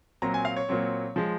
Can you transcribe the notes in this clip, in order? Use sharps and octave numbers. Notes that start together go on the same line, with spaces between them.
A#2 F#3 C4 A#5
G#5
F5
C#5
A#2 F#3 C4
F3 G#3